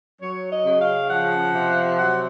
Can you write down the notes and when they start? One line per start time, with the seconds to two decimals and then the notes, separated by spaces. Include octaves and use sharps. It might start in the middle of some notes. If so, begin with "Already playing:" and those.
0.21 F#3 C#5
0.51 D#5
0.66 C#3
0.81 F5
1.10 F3 F#5
1.55 C3
1.99 F#3 F#5